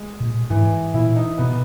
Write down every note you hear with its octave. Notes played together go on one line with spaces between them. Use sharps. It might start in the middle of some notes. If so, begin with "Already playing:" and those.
Already playing: G#3
A#2
G#2 E3
A#2 E4
D#4
B2 B3